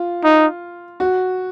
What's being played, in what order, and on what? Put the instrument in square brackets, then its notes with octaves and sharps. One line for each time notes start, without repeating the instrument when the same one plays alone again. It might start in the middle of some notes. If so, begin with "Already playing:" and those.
Already playing: [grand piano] F4
[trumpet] D#4
[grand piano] F#4